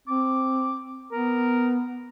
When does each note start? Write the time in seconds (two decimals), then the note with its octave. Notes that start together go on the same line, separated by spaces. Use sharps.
0.07 C4 D6
1.11 B3 A#4